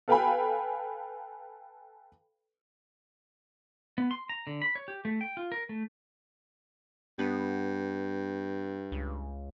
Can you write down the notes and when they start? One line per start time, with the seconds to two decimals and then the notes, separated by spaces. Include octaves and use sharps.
0.08 A4 B4 F5 G5 G#5 B5
3.98 B3
4.11 C6
4.29 A#5
4.47 D3
4.62 B5
4.75 C#5
4.88 G4
5.05 A3
5.21 G5
5.37 F4
5.52 A#4
5.69 A3
7.19 G2 B3
8.92 C#2